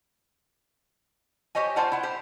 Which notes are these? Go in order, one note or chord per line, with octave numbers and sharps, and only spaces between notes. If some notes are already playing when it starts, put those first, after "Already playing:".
G4 C5 C#5 D#5 G#5
F4 C5 D5 F#5 A5
E4 F#5
G4 C5